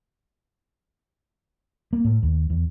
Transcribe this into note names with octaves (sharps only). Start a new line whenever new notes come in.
A#3
A2
D#2
E2